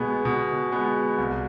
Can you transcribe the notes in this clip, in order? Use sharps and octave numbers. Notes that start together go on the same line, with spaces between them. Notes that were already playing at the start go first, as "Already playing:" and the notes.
Already playing: B2 G#3 B3
B2
G#3 B3
C2